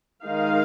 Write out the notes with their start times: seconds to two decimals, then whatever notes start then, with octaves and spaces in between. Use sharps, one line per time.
0.24 D#3 G#3 D#4 F5